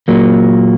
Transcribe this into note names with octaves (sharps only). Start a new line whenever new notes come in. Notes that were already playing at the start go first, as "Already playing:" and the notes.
A#2 F#3 A#3